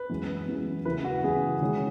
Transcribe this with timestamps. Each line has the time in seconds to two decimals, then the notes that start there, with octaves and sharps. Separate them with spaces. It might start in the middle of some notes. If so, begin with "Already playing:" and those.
Already playing: B4
0.09 F#2 E3 G#3 B3
0.48 F#2 E3 G#3 B3
0.85 F#2 C#3 E3 B3 E4 B4
1.05 F#4
1.24 F#2 C#3 E3 B3 E4 G#4
1.61 D#3 G#3 C#4 E4